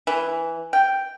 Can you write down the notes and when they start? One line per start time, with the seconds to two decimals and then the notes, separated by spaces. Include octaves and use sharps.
0.07 E3
0.73 G5